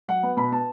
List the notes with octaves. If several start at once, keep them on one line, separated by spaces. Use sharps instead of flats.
F#3 F#5
B3
B2 B5
B3 A5